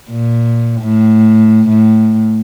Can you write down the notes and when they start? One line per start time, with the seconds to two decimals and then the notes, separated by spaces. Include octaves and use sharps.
0.10 A#2
0.81 A2
1.69 A2